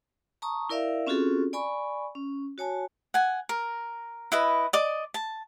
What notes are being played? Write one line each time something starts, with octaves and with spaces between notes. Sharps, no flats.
A5 A#5 C#6 D#6
E4 A#4 D5 E5 F5
C4 C#4 F4 F#4 G#4 A4
D5 G#5 B5 C#6
C#4
F#4 C#5 G#5 A5
F#5 G#5
A#4
E4 B4 D#5
D5 D#5 D6
A5